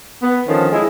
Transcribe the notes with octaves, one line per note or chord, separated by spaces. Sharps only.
B3
D3 D#3 F3 C#4
G#3 E4